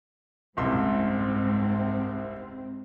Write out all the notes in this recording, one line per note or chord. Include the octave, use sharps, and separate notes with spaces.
F#1 C2 G#2 C4 C6